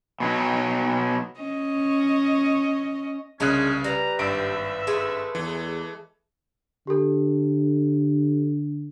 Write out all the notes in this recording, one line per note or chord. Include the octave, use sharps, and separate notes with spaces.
B2 F#3 D#4
C#4 D#5
C2 C#3 G#3 C#4 D4 F#6
G3 B4 A#5
G#1 G2 E5 D7
G#3 A3
E2 E3
D3 G4 A4